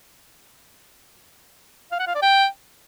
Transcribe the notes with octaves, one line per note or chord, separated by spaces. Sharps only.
F5
F#5
F5
D5
G5